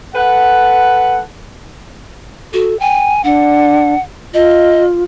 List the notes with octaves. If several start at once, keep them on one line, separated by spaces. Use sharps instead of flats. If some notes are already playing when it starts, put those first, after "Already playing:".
A4 B4 F#5
F#4 A4
G5 G#5
D4 F#5
F4 D#5